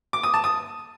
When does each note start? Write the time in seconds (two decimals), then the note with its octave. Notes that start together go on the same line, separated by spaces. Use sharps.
0.13 D6
0.23 D#6
0.34 A5
0.44 D#6